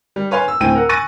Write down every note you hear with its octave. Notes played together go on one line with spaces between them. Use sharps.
G3
B4 C#5 F5 G#5 C6
E6
D2 A2 C4 G5 G#5 D#7
A#4 F#5
G#5 C#6 F#6 A6 A#6 D#7